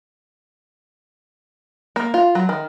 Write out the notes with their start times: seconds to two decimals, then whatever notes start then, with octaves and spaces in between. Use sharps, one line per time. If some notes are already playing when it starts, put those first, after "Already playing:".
1.96 A#3
2.14 F4
2.35 F#3
2.49 D#3